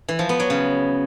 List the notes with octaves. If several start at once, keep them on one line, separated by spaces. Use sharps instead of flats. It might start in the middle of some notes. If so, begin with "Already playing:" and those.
E3
F3
B3
F#3
C#3